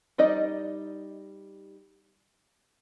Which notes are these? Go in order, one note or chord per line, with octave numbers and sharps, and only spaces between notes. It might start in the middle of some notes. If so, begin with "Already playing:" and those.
G3 D#4 D5 D#5